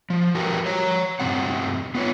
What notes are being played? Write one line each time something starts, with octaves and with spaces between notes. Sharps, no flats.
F3
F#4 G4 A#4 B4 G5
C#5 A#5
E2 G2 C3 F3 C4 F#5
B3 F4 B4 C#5